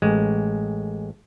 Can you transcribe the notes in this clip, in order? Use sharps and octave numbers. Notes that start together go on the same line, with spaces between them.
A1 G#3